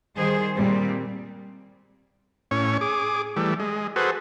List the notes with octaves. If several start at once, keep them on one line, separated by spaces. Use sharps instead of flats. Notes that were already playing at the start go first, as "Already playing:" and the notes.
D#3 G3 G#4 C5
A#2 G3 C4
A2 C#4 C#5
G#4 D6
E3 G3 A3
G#3
F#4 G#4 A4 B4 C5